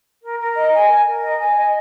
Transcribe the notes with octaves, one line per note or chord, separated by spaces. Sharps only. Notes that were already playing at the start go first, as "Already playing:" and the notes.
A#4
A#4
D#5
G#5
A#4
A#4
D#5
G#5
D#5